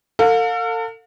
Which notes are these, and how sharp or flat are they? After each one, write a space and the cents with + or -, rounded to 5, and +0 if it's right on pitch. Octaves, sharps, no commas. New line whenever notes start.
A4 +40 F5 +35